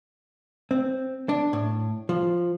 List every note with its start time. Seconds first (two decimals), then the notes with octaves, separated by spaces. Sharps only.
0.71 C4
1.29 D4
1.53 A2
2.09 F3